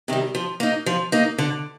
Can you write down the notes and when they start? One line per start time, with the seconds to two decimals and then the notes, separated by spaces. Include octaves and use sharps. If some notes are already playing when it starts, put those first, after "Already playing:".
0.08 C3 D#3 G3
0.35 F3
0.60 A#3 D#4
0.86 F3
1.12 A#3 D#4
1.38 D3